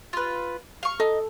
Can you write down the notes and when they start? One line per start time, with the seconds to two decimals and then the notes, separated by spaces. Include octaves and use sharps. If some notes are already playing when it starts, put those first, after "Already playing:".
0.13 F4 B4
0.83 F5 C#6
1.00 D#4 A4